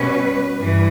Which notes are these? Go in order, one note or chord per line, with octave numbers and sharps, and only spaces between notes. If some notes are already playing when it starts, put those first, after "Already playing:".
Already playing: B2 G3 C#4 B4
G2 E3